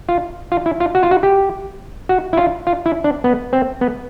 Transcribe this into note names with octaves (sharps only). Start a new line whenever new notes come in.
F4
F4
E4
F4
F#4
F4
F#4
G4
F#4
E4
F4
F4
E4
D4
B3
C4
B3